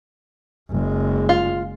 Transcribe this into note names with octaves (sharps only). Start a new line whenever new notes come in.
F#1 G#3
F4